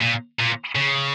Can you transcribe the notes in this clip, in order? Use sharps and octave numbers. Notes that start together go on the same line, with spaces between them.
A#2
A#2
C#3